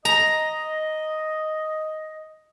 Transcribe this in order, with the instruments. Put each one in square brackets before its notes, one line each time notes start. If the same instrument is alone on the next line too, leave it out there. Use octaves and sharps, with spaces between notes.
[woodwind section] D#5 [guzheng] A#5